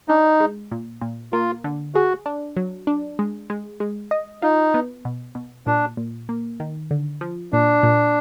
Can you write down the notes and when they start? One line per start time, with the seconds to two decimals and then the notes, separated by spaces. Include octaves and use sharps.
0.08 D4 D#4
0.40 G#3
0.71 A#2
1.01 A#2
1.33 A#3 F4
1.64 D3
1.95 F#4 G#4
2.26 D4
2.57 F#3
2.87 D4
3.19 G#3
3.50 G#3
3.80 G#3
4.11 D#5
4.42 D#4 F4
4.74 B3
5.05 B2
5.35 B2
5.67 A#2 D4
5.97 A#2
6.29 A#3
6.60 D#3
6.91 D3
7.21 F3
7.52 A#2 D4
7.83 A#2